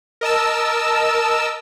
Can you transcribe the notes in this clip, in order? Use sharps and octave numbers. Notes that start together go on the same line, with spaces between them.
A#4 D#5 A5 E6